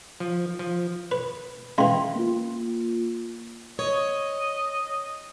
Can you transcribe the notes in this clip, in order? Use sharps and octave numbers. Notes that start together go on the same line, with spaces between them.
F3
F3
B4
E3 G#3 C#4 F5 C6
A#3 F4
C#5 D#5